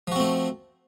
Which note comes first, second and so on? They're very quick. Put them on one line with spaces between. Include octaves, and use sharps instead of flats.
F3 F#4 C4 A3